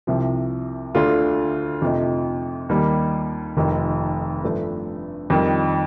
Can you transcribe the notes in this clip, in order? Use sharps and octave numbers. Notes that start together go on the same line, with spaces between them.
C2 C3 F3
D2 D3 A3 D4 F4
F2 C3 F3 A3 D#4
D#2 D#3 G3 A#3
F1 F2 D#3
G2 F3 A3 D4
F2 D#3 G3